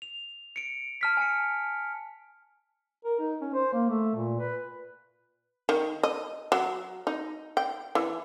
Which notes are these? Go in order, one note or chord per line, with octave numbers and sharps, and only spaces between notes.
F7
C#7 D7
A5 F6 B6
G#5 A5 C#7
A#4
D#4
C#4
C5
A#3
A3
A#2
B4
D#3
D#5
F#3
D#4
G5
E3